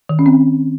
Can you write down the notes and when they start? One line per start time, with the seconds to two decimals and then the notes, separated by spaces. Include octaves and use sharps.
0.09 D#3
0.19 C#4
0.26 C4